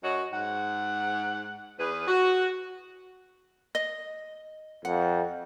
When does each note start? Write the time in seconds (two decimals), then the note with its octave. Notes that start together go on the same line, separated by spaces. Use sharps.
0.03 F#2 F#4 C#5 D#5
0.32 G#2 F#5
1.79 E2 G#4 B4
2.07 F#4
3.75 D#5
4.85 F2 F#5